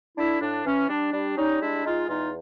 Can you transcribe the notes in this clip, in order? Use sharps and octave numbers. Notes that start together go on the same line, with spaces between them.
A3 D4 E4
A2 D4
E3 C#4
G3 D4
G3 D4
G3 C#4 D#4
G#3 D4 E4
G#3 D#4 F4
E2 D#4 F4